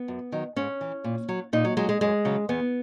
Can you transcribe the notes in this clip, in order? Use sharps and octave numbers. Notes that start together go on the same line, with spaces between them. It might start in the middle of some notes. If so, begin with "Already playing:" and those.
Already playing: B3
F#2
D#3 F#3
G#2 C#4
E3
A#2
F#3
A#2 D#4
F#3
F#3 G#3
G#3
F#2 G#3
C#3 F#3
E2 B3